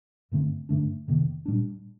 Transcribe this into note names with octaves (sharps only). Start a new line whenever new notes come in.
G2 D3 A3 C4
G2 D3 A3 D4
F2 C3 D#3 A#3
A#2 G3 D4